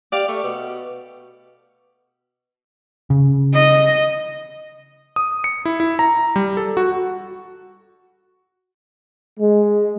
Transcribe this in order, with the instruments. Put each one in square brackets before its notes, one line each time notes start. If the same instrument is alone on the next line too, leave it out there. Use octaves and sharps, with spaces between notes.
[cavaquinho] G4 F5 [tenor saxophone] D5
[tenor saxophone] A3
B2
[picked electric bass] C#3
[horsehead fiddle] D#5
[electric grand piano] D#6
C#7
E4
E4
A#5
G3
A4
F#4
[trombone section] G#3